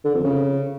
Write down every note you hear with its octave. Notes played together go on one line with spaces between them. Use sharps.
D3
F2
C#3